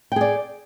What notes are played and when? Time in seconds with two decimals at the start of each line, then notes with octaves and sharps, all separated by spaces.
0.12 G5
0.16 G#4
0.21 D5